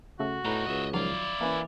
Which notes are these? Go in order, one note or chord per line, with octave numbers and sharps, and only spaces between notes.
C#3 A3 F#4
A2 B3 D#4 B4 A#5
C#2 D#5 E5
D#3 F3 F#3 E4 D5 F5
E3 A#3 C#4